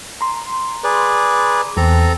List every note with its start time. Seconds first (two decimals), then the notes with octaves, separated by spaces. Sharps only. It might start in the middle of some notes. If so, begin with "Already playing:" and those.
0.21 A#5 C6
0.84 G#4 B4 D5
1.77 E2 C4 A4 A#5